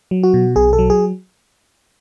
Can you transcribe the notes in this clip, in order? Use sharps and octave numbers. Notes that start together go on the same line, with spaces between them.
F#3
F#4
B2
B1 G#4
A4
F#3
G#4